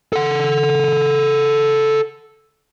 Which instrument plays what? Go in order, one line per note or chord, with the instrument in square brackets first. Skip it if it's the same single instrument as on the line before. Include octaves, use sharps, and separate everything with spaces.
[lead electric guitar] A4 F#5